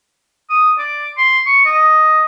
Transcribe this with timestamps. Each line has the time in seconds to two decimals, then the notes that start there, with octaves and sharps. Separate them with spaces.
0.50 D#6
0.78 D5
1.18 C6
1.46 C#6
1.65 D#5